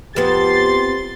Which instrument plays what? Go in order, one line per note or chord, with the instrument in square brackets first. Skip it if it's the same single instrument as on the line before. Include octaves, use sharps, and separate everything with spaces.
[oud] F2 B3 [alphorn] G4 [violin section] C6 A6